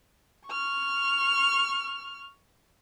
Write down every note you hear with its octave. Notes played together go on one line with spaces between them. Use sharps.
C#6 F6